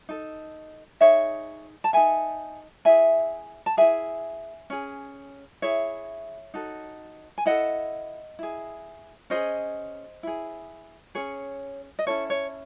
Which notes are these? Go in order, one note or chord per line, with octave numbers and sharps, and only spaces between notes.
D#4 A4
D#4 G#4 C#5 E5
A5
D#4 A4 E5 G#5
E4 G#4 E5 G#5
A5
E4 G#4 E5 G#5
C#4 G#4
E4 G#4 C#5 E5
D#4 F#4 A4
G#5
E4 A4 D#5 F#5
E4 G#4
C#4 E4 G#4 C5 D#5
E4 G#4
C#4 G#4 C#5
D#5
C#4 E4 A4 C#5
C#5